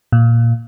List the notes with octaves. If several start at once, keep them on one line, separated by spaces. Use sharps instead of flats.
A#2